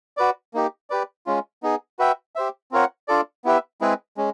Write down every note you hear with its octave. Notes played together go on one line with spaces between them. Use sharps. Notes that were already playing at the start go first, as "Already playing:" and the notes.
F#4 B4 D5
A#3 D#4 G4
G4 B4 D5
G#3 C#4 F4
B3 D#4 G#4
F#4 B4 E5 G5
G4 C5 E5
C4 F4 A#4 C#5 F#5
D4 F4 A4 D5
B3 E4 G4 B4 E5
G#3 C4 E4 G#4 B4
G#3 C#4